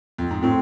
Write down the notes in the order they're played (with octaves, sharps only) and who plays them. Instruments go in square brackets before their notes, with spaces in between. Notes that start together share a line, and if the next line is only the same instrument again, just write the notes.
[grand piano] F2
G#2
[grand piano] A2 [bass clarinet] C4